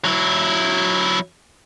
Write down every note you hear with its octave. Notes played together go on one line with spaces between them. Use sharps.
F#3 E4